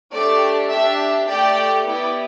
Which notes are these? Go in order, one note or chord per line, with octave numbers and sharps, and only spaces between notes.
A3 D4 G4 D5
D4 G4 E5
A3 G4 D5 G5
B3 E4 G4 D5 G5